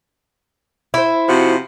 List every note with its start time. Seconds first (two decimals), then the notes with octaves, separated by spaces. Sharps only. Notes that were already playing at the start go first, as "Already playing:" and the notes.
0.94 E4 C5
1.28 C3 F3 F#4